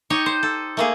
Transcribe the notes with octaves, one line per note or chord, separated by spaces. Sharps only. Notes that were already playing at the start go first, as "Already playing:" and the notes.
D#4 G4 C#5 D#5
C5
A4
A3 A#3 G#4